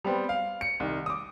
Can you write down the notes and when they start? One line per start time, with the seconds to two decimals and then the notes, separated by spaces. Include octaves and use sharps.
0.05 G3 B3 C4
0.29 F5
0.61 C#7
0.80 C2 D#3
1.06 D6 D#6